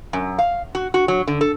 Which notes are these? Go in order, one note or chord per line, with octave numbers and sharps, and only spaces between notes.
F#2
F5
F#4
F#4
F#3
D3
A4